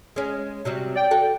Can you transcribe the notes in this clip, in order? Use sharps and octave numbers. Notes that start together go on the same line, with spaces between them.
G#3 C#4
C3 F#3 G3
D5 G5
F#4 A4